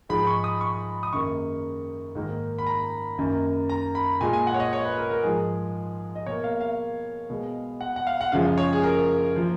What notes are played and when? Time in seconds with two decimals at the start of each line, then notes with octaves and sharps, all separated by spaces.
0.09 G#2 F3 G#3 B5
0.27 C#6
0.44 D#6
0.61 C#6
1.03 D#6
1.13 F#2 D#3 A#3 C#6
2.15 G#2 D#3 A#3
2.58 B5
2.67 A#5
3.18 F#2 D#3 A#3
3.70 A#5
3.95 B5
4.21 A#2 G#3 G#5
4.33 G#5
4.47 F#5
4.54 C#5
4.60 D#5
4.73 C#5
4.85 B4
4.98 A#4
5.11 A#4
5.24 G#2 F3 G#3 G#4
6.15 D#5
6.26 B2 A#3 C#5
6.44 F5
6.61 F5
7.30 B2 G#3
7.81 F#5
7.96 F#5
8.07 F5
8.21 F#5
8.32 F#2 C#3 F3 G#3 F5
8.58 C#5
8.73 G#4
8.83 A#4
9.36 F3 A#3